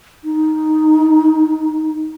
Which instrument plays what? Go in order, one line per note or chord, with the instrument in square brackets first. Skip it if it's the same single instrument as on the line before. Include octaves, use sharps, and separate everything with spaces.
[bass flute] D#4